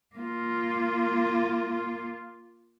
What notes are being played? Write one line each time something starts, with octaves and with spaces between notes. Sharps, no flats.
A#3 F4